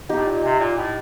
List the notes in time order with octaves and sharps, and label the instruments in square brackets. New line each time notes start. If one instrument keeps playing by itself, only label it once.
[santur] D#4 G4
[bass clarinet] A2
A#2
C3
A#2
A2